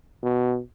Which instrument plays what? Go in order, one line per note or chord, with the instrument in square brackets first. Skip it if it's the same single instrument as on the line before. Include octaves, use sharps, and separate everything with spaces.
[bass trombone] B2